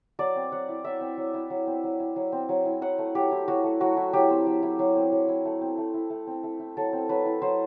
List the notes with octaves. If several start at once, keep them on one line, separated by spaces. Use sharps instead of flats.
F#3 D5
C4
F#3 F#5
E4
F#3 E5
C4
F#3
E4
F#3
C4
F#3
E4
F#3
C4
F#3
E4
F#3 F#5
A3
F#3 G4
E4
F#3 F#4
A3
F#3 F#4
E4
F#3 G4
C4
F#3
E4
F#3
C4
F#3
E4
A3
C4
A3
E4
A3
C4
A3
E4
F#3 A4
C4
F#3 B4
E4
F#3 C5